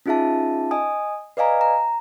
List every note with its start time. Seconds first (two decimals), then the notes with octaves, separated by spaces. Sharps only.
0.06 C#4 D#4 F4 G#4 E5 A5
0.71 D#5 G#5 D#6
1.37 B4 D5 D#5 F5 G#5 A#5
1.61 A#5